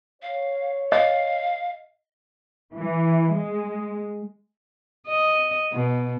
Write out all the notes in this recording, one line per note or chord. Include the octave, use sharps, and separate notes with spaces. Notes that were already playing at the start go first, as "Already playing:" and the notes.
C#5 F5
D#5 F5
E3
G#3
D#5
B2